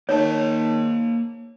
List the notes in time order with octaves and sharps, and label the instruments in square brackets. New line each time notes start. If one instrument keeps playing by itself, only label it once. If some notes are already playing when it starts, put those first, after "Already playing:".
[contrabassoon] D#3 [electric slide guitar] A#3 A5 [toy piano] C#5